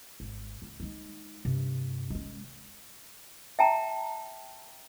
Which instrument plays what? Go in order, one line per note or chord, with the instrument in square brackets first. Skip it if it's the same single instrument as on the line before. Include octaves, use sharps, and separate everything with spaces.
[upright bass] G#1
C#2
G#3 D#4
G2 C3
G#3 C#4
[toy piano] E5 G5 A5 A#5